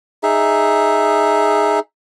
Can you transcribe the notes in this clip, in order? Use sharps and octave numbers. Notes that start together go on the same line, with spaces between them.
D#4 G#4 E5